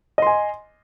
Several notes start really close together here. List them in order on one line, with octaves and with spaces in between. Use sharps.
D#5 C6 G#5